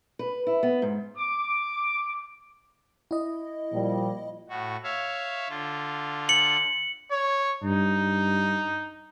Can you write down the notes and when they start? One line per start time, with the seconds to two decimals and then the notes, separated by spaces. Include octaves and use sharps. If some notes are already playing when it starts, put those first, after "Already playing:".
0.19 B4
0.47 E4
0.63 B3
0.82 G#2
1.17 D6
3.11 E4 D#5
3.72 A#2 F3 G3
4.49 A2 F#4
4.84 C#5 E5 F5
5.49 D3 F4
6.29 C#7 F#7
7.11 C#5
7.64 G2 D#4